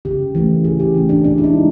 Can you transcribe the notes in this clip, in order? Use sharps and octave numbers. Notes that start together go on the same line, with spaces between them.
C#3 G4
E3 A3 C#4
C#3 G#4
G4
E3 A3 C#4
D4
A#2 D4
E4
D#4
G#3